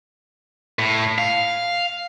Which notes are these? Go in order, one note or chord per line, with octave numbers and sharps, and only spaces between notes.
A2
F5